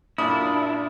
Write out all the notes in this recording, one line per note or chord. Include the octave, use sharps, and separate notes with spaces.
F#2 A#2 D4 E4 D#6